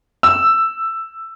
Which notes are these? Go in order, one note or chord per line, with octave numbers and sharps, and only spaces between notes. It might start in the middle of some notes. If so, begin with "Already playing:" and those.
E6